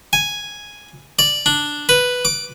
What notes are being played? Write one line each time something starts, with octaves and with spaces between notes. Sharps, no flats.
G#5
D5
D4
B4
D6